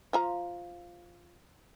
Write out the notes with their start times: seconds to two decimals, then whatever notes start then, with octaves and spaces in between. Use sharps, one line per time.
0.13 F3 F4 A#5